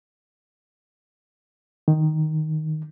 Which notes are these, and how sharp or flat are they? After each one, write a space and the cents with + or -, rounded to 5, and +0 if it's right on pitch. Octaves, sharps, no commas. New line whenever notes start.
D#3 +0